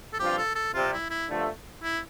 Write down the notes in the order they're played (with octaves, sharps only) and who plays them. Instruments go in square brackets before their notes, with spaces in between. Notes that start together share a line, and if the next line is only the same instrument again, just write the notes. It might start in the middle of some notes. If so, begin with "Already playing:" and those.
[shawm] A4
[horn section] G2 F3 C4 F4 [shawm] G4
[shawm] A4
A4
[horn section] C3 G3 C4 [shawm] F4
[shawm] E4
E4
[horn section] G2 D3 F3 A3
[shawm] E4